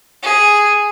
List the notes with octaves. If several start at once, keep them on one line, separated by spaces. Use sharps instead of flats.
G#4